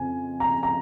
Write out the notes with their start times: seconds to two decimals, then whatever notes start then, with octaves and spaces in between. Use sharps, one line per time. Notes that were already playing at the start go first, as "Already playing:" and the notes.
Already playing: F2 C#3 C4 G#5
0.40 A#5
0.63 A#5